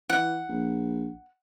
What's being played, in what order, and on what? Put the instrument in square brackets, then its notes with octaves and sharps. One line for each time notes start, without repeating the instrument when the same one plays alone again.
[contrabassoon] E3 [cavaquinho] F#5
[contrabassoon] A#1